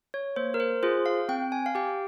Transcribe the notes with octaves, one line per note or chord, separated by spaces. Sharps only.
C#5
A#3 C5
A#4
C5
F4 G#4 C5
F5
C4 G5
G#5
F5
G4 G5